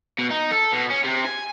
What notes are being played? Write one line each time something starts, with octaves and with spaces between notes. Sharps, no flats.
B2
D#4
A4
B2
C#4
C3
G#5